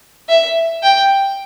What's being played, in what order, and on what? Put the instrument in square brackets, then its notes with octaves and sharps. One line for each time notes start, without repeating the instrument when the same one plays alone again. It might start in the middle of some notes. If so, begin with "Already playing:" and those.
[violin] E5
G5